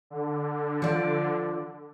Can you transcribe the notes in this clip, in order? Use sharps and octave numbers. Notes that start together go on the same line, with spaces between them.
D3
F3 D5